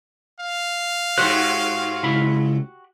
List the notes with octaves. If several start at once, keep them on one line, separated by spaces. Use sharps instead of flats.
F5
G#2 F#4 G4 C5 F#6
C#2 E4 B5